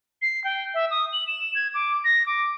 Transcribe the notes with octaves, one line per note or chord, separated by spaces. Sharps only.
C7
G5
E5
D#6
F#7
E7
G#6
D6
A#6
D6